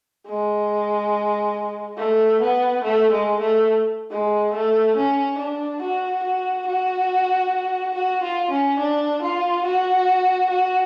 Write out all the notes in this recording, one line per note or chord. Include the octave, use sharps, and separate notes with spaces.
G#3
A3
B3
A3
G#3
A3
G#3
A3
C#4
D4
F#4
F#4
F#4
F#4
F4
C#4
D4
F4
F#4
F#4